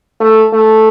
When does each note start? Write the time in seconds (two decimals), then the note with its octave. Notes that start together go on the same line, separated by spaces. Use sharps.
0.20 A3
0.53 A3